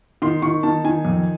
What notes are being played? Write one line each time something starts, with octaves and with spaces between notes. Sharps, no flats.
D#3 C6
D#3 C#6
D#3 A5
D#3 G#5
F2